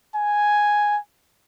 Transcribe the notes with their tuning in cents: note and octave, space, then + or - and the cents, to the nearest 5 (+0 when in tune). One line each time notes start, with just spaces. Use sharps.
G#5 +0